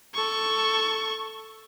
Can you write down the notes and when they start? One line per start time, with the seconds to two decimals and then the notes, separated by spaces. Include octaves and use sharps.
0.14 A4 C#6